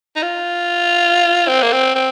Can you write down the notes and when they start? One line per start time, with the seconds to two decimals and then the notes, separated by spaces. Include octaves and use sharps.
0.16 D#4
0.22 F4
1.48 C4
1.62 A#3
1.72 C4
1.95 C4